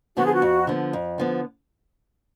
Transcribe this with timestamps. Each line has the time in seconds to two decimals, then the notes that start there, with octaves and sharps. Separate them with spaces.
0.17 D3 F3 B3 F#4
0.25 G#4
0.34 F#4
0.42 F2
0.67 D3 F3 B3
0.93 F2
1.18 D3 F3 B3